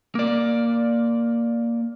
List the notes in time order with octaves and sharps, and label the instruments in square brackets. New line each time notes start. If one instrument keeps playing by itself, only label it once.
[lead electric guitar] A#3 D5